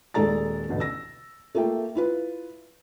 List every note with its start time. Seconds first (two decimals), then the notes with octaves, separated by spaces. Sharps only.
0.14 D#1 G#3 A4 D5 A#5 A6
0.69 A1 D2 B2
0.80 E6 A#6
1.55 A3 A#3 F4 E5 G5
1.95 E4 F4 B4